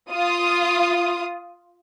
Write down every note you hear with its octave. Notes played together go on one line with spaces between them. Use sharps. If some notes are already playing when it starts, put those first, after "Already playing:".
F4 D#6